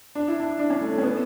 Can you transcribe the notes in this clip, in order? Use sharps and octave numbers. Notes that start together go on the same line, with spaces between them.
D4
E4
D4
D4
C#4
A3
A3
C#4
B3